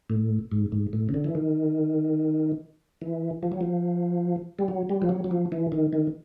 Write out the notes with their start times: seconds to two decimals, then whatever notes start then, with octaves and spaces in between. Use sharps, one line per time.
0.10 A2
0.52 G#2
0.72 G#2
0.93 A2
1.09 C#3
1.14 D3
1.24 E3
1.35 D#3
3.02 E3
3.43 F3
3.52 F#3
3.61 F3
4.59 G3
4.68 F#3
4.89 G3
5.02 F3
5.09 F#3
5.24 F#3
5.31 F3
5.52 E3
5.72 D#3
5.93 D#3